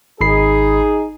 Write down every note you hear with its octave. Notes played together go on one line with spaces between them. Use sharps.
G#1 D#4 G#4 B5 C7